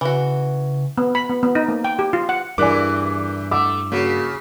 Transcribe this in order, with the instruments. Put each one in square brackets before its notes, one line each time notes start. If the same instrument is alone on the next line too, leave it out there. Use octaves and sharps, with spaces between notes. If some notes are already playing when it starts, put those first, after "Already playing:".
[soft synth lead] C#3 [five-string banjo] E3 F#4
[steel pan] B3
B5
B3
B3
D#4
A#3
G5
G4
F4
F#5
[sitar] E2 E3 [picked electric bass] G2 [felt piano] A#4 D5 G#5 [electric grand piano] D6 F#6
[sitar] A3 [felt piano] F#5 D6 E6
[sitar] C#3 [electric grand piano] A#3 F#4